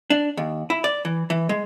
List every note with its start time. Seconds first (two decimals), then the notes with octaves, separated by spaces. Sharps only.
0.10 D4
0.37 D#2
0.70 E4
0.84 D5
1.05 E3
1.30 E3
1.49 G#3